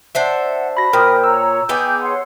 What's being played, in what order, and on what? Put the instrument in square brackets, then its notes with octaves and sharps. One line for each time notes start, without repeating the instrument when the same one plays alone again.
[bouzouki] D4 C5 E5 [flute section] F#5
[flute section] F#4 [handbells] B5 A#6
[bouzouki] A#2 [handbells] A#4 C5 G5 [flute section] D#6 F6
[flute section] C#5 A#5 [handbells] E6
[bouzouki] B3 D#4 G#4 [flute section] G5 D6 G6
[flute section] C#5 F#5 C6